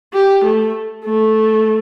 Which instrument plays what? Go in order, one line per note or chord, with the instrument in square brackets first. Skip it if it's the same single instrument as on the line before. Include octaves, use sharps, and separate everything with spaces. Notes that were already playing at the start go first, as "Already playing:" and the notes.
[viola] G4
A3
A3